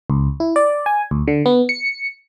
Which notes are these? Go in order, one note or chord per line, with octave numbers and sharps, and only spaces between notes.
C#2
E4
D5
G#5
D2
D3
B3
C#7